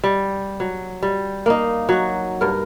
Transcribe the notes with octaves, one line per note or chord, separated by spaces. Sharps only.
G3
F#3
G3
A#3 D#4
F#3 F#4
G2 A#4